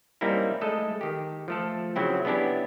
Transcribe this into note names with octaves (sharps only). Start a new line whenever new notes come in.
G3 A#3 C4 C#4 D#4 E4
G#3 A3 A4 D#5
D#3 G4
F3 A3 A4
C#3 F#3 C4 E4 G5
B3 C#4 D4 E4 G4